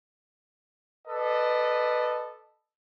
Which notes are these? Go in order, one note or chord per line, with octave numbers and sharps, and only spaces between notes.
A4 B4 D5 D#5